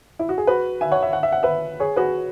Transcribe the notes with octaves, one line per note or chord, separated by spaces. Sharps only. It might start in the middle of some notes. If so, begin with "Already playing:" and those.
E4
F#4
G#4
F#4 B4
E5 G#5
C#5 F#5
E5
F#5
E5
F#5
B4 E5
G#4 C#5
F#4 B4